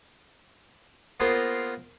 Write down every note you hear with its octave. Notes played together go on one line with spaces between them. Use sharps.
A#3 B3 F4 G#4 A#4 C5